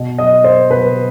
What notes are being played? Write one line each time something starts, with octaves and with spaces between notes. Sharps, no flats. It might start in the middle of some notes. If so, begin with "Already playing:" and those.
Already playing: B2
D#5
C5
B2 B4